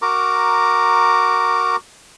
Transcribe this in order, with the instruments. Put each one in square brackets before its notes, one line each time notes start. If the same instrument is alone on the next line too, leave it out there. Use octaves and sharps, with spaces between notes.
[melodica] F#4 A#4 A#5 D6